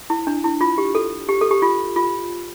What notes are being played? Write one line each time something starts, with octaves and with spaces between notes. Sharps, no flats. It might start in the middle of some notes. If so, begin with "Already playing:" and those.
E4
D4
E4
F4
G4
A4
G4
A4
G4
F4
F4